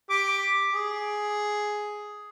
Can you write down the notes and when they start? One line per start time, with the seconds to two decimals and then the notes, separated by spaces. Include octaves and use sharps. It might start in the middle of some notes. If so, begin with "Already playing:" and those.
0.10 G4 D6
0.71 G#4